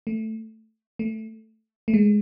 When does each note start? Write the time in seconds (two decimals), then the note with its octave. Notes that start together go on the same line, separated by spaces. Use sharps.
0.07 A3
0.99 A3
1.88 A3
1.94 G#3